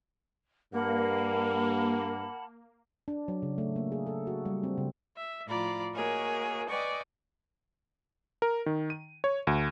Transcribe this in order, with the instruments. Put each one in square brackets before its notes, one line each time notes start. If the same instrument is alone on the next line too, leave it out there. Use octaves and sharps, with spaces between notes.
[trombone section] G2 [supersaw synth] A#3 [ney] A#4 [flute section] F#5 A5 B5
[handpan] D4
F#3
C#3
A3
A#3
G#4
A4
F#4
G3
C4
C#3
[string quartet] E5
A2 F3 F4 D5 A#5 B5
A#3 F#4 G#4 A#4 C#5 D#5
B4 D5 D#5 G5 G#5 C#6
[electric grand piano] A#4
D#3
D#7
C#5
D2